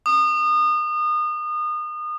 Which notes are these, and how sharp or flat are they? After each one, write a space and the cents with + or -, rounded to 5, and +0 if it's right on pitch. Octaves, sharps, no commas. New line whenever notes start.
D#6 -30